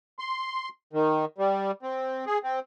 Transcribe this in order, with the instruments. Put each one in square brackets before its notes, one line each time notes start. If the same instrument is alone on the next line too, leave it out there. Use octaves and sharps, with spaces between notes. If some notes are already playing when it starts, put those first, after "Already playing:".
[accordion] C6
D#3
G3
C4
G#4
C4